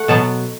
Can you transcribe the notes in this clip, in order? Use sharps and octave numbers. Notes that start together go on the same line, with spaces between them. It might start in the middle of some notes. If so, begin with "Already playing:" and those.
Already playing: A3 F#5
B2 F#3 B3 A5